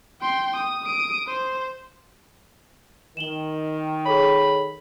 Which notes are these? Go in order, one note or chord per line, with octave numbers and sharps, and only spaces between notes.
G5 C6
D#6
D#6 D7
C5
D#3 E7 F#7 G7
G#4 A4 C#5 B5